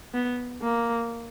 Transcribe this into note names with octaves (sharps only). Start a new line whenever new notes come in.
B3
A#3